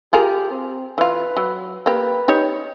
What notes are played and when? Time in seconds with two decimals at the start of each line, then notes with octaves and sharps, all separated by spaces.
0.13 F4 G4 G#4 A#4
0.50 C4
0.98 E3 F4 B4
1.37 F#3
1.86 A#3 G4 B4
2.28 D#4 G4 C#5